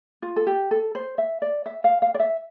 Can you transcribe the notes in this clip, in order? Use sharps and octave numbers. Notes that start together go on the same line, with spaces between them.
F4
A4
G4
A4
C5
E5
D5
E5
F5
F5
D5
E5